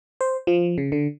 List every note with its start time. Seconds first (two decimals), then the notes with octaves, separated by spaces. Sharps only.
0.21 C5
0.47 F3
0.78 C#3
0.92 D3